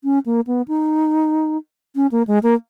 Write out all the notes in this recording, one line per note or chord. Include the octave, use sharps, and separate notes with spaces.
C#4
A#3
B3
D#4
C#4
A#3
G#3
A#3